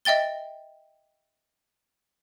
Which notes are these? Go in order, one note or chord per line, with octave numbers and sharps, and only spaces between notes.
D#5 E5 G5 A6 G7